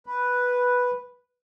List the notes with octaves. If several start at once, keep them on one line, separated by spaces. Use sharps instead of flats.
B4